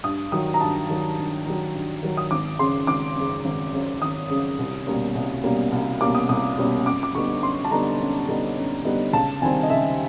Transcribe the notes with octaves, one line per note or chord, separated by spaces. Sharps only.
G2 D#6
D#3 F#3 D#6
A#5
G2 A5
D#3 F#3
G2
D#3 F#3
G2
D#3 F#3
D#6
G#1 D6
F#2 C#3 C6
G#1 D6
F#2 C#3
G#1
F#2 C#3
G#1 D#6
F#2 C#3
C2
B2 G3 A#3 C#4
C2
B2 G3 A#3 C#4
C2
B2 G3 A#3 C#4 D6
D#6
C2 D#6
B2 G3 A#3 C#4
F#2 D6
D6
D3 G3 B3 D#4 C#6
F#2 C6
A5
D3 G3 B3 D#4 A#5
F#2
D3 G3 B3 D#4
F#2
D3 G3 B3 D#4
C#2 A5
C3 D#3 G3 C4 G#5
D#5
C#2 E5